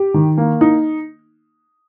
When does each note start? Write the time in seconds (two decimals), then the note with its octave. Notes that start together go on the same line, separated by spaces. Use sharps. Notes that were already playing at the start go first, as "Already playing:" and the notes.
Already playing: G4
0.14 D#3
0.38 A#3
0.61 D#4